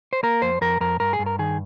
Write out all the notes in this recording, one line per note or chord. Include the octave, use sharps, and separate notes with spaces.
C5
A#3 A#4
F2 C5
F2 A#4
F2 A#4
G2 A#4
G#4
G2
A#4
D#3 G#4